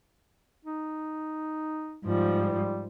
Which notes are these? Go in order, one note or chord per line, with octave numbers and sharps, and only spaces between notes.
D#4
G#2 F3 G3